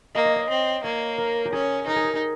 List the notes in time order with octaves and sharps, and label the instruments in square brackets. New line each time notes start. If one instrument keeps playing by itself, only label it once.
[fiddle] A#3 [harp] D#5
[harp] C#5
D#5
[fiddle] C4
[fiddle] A#3 [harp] C#5
[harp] A#4
G4
[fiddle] C#4 [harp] G#4
[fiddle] D#4 [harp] A#4
[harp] G#4
G4
G#4